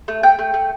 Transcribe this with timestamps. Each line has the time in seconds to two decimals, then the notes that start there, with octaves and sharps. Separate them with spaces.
0.08 A3
0.23 A3 G5
0.39 A3
0.54 A3